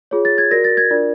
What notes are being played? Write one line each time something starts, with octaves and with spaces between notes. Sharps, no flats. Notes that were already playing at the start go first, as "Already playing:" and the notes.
F4 G#4 C#5
A6
G#6
F#4 A#4 D5 A#6
A6
G#6
D4 F4 A#4 D5